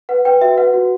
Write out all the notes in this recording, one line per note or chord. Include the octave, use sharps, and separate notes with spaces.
B4 F#5
B4 G5
F#4 E5
B4 F#5
F#4